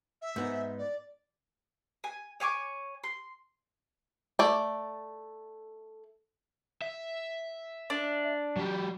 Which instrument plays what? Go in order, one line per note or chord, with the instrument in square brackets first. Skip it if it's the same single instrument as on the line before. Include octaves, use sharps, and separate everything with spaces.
[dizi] E5
[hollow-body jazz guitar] G#2 B3 D#4
[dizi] D5
[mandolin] G#5
C#5 G#5 C#6 D6
C6
[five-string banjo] A3 D5
[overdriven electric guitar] E5
[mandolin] D4
[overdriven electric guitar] F#3 G4